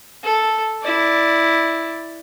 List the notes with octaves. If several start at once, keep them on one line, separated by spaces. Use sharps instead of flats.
A4
E4 D5